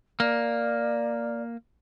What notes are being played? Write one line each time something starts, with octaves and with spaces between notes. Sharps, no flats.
A#3 D5